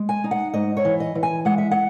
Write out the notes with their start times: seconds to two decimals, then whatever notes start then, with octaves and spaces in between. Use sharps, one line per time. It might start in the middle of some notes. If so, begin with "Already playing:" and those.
Already playing: G#3
0.09 G#5
0.24 D#4
0.31 F#5
0.54 G#2 D#5
0.77 C#5
0.85 E3
1.00 D#5
1.15 E3
1.23 G#5
1.45 G#3 F#5
1.58 E5
1.71 F#5